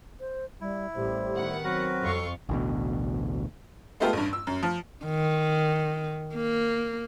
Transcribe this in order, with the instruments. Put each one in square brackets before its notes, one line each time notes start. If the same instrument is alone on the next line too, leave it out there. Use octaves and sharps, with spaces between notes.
[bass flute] C5
[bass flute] G3 [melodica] E4
[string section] A1 [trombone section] A2 G3 C5 [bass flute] G4
[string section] D#3 B3 F#5
[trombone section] F#3 C4 [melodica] F#4 A#4 B4
[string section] F2 F4 C#6 [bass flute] A4
[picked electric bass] A1 D2 B2
[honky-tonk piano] G#3 A3 B3 F4 G4 A4
A1 G2
E6
F#2
F3
[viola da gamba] D#3
A#3